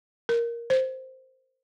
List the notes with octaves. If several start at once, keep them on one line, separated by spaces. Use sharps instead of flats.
A#4
C5